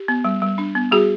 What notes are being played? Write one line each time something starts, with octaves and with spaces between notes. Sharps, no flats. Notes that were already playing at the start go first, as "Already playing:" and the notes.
Already playing: G4
B3
G3
G3
D4
B3
G3 F#4 G#4